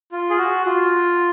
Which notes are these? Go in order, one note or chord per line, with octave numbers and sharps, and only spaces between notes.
F4
G#4
F#4
F4